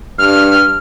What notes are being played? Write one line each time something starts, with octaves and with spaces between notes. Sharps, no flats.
G2 F6